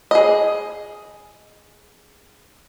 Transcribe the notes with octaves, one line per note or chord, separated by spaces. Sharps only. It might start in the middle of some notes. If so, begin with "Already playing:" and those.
G#4 D#5